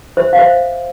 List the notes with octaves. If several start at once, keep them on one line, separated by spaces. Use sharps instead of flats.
C5 E5
F5
C5 E5